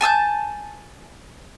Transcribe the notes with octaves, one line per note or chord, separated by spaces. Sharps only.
G#5 A5 E6 G6